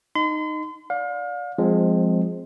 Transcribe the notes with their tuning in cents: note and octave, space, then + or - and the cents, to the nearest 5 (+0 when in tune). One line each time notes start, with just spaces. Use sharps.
D#4 -10 C6 -40
D5 -15 F5 +35
F3 +20 G#3 +0 C4 +0